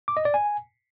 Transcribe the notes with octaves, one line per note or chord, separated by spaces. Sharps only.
D6
D#5
D5
G#5